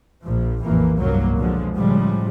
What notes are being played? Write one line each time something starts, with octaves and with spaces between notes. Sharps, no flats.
A#1 F3
A#1 F2 A2 E3 A#3
F1 C2 G2 F#3 A#3
B2 D3 F3 G#3
A2 C#3 F3 G3 G#3